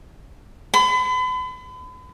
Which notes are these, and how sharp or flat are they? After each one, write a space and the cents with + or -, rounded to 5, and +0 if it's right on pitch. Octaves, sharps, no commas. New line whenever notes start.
B5 +40